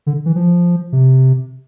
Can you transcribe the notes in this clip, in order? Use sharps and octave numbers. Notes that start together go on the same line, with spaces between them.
D3
E3
F3
C3